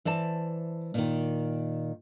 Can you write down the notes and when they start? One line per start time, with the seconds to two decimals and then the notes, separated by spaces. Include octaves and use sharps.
0.05 E3 C5 D5 A5
0.94 A#2 D#3